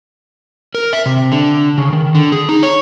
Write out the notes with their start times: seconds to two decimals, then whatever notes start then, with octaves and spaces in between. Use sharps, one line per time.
0.75 A#4
0.93 E5
1.06 C3
1.32 D3
1.78 C#3
1.93 D#3
2.15 D3
2.32 G#4
2.49 D#4
2.63 C#5